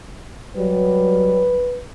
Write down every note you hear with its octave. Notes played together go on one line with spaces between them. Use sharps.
F#3 G3 B4